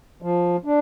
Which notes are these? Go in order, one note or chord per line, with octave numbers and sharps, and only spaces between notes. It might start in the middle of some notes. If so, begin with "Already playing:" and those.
F3
D4